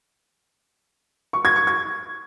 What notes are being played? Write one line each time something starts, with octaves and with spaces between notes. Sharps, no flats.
C#6
G#6
C#6
G#6